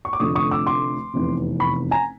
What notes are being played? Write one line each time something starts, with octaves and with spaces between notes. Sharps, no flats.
C#6
D6
F1 F2 D3 F3 A3 C#6 D#6
C#6 D#6
D6 E6
C6 D6
F1 E2 C3
B5 C#6
G#5 A#5